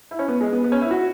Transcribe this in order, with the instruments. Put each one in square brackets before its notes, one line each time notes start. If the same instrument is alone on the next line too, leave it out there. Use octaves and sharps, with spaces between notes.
[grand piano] E4
C#4
B3
G#3
B3
B3
C#4
E4
F#4